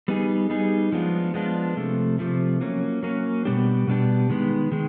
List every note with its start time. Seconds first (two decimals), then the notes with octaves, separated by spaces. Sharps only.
0.08 G3 B3 D#4 G#4
0.50 G3 B3 D#4 G#4
0.92 F3 G#3 B3 D4 F4
1.34 F3 G#3 B3 D4 F4
1.77 C3 F3 A3
2.19 C3 F3 A3
2.61 F#3 A#3 C#4
3.03 F#3 A#3 C#4
3.45 B2 G3 B3 D4 G4
3.87 B2 G3 B3 D4 G4
4.30 D#3 G#3 B3
4.72 D#3 G#3